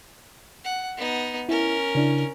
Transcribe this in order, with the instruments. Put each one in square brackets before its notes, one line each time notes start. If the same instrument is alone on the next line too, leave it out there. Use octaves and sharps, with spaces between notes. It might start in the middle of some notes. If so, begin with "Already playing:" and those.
[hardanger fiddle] F#5
B3 D#4
[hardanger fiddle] C#4 A#4 [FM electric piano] E4
[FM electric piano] C#3 D4 E4